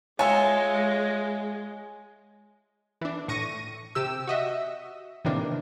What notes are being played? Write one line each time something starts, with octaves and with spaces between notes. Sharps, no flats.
G#3 F4 C#5 E5 G#5
E3 D4
A2 C#6 A#6 D#7
C3 G4 E6
F#4 D#5 E5
A2 C3 D#3 E3 A#3 D4